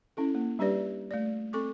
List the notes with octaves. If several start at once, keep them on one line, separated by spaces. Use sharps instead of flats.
C#4 E4 A4
A#3
G3 D4 G4 B4 D5
A3 D5
C4 A4 C#6 D6